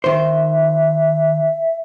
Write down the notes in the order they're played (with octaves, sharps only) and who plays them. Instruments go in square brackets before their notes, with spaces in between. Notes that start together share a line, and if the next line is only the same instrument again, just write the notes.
[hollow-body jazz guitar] D#3 C5 [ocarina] E5